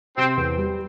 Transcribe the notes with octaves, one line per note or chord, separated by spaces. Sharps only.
C3 C4
E2
G3